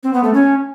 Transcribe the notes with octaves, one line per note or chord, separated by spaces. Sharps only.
C4
B3
A3
C#4